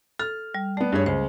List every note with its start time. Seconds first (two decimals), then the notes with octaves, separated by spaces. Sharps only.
0.19 A4 F6
0.55 G3
0.77 A3 B3 D5
0.92 G2 G#4 C#5
1.06 C#2 C5